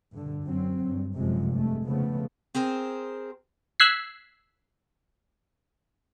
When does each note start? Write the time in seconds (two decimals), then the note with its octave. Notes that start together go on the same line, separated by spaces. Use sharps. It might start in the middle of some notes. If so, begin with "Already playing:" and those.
0.12 G2 D3
0.45 F#2 F#3 C4
0.84 G2
1.16 F1 F#2 C3 F3 G#3
1.52 G2 G#3 A3
1.85 C#3 F3 A3 B3
2.54 C4 G#4 A#4 C5
3.80 E6 F#6 G#6 B6 C7